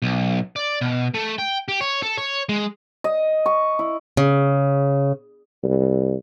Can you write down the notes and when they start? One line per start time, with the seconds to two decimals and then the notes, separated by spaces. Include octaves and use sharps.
0.02 B1
0.56 D5
0.81 B2
1.14 A3
1.38 G5
1.68 G4
1.81 C#5
2.03 A4
2.18 C#5
2.49 G#3
3.04 D#5
3.46 C#6
3.79 E4
4.17 C#3
5.63 C2